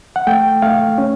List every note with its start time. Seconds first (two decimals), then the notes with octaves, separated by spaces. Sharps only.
0.16 F#5
0.27 A3 G5
0.62 A3 F5
0.98 C#4